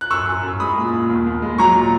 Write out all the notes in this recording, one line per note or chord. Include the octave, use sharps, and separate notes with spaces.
F#6
F#2 C#6 E6
F#2
F#2
G#3 B5 D#6
A#2
A#2
D#2
D#2
G#3
F#3 A#5 C#6
A#2